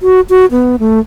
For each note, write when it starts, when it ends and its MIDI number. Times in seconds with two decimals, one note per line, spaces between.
0.01 0.21 66
0.30 0.46 66
0.51 0.76 59
0.79 1.00 57